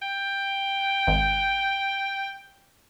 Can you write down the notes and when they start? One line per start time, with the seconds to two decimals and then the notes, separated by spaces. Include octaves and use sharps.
0.02 G5
1.07 G#1